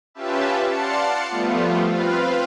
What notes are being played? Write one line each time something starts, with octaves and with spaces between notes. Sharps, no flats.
C#4 F4 G4 B4 E5 A5
D5 F5 F#5 A5 C6 C#7
F3 G3 A3 B3 F4
C4 F4 B4 F5